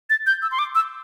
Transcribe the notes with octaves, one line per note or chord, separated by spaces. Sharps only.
A6
G6
E6
C6
D6
E6